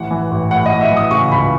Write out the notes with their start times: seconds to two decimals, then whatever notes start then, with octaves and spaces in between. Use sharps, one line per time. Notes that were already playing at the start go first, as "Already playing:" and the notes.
Already playing: A1 E3 F#5
0.11 E3
0.31 A1
0.51 A2 F#5
0.66 D#5
0.71 A2
0.81 E5
0.91 E3
0.97 D#6
1.11 C#3 C#6
1.32 C#2 B5